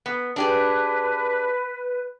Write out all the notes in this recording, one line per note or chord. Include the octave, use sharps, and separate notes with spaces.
B3
D4 G4 G#4 B4